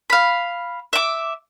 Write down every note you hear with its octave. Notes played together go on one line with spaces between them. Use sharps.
F5 B5
E5 D6